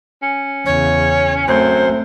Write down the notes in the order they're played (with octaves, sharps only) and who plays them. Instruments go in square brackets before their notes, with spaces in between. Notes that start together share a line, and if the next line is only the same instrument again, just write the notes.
[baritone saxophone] C#4
[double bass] E2 C#3 [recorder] C#5
[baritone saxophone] F#2 [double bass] A3 C4 [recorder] C5